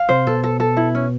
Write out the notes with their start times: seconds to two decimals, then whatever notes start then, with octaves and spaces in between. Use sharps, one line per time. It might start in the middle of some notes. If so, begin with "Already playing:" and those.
Already playing: F5
0.09 C3 C5
0.27 B2 A4
0.44 A4
0.60 A4
0.77 E4
0.95 C#4